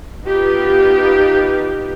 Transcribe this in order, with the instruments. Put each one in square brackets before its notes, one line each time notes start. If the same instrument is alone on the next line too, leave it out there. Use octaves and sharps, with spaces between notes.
[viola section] B3 D#4 F4 G4 B4